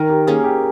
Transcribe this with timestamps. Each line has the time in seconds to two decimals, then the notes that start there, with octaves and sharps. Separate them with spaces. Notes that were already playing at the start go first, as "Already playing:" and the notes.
Already playing: D#3 A#4
0.10 G4
0.27 A#3 C#4 G#4
0.44 G4